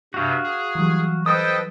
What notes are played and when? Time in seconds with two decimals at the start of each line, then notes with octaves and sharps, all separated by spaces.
0.14 G2 C3 F#4 F5
0.44 G#4
0.75 E3 F#3 G3
1.26 A4 B4 C5 D#5 G5 D#6 G6